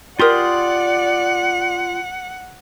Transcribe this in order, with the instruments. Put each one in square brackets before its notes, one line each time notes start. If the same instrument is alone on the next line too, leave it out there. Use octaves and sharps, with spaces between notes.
[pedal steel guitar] F4 C6 D#6 [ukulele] G4 A#4 [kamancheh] D5 [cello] F#5